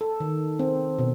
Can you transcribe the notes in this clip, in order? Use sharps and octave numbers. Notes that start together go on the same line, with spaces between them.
A4
D#3
C4
B2